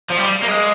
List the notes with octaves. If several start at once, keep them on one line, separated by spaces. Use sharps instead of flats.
F3
G3
A#3
G#3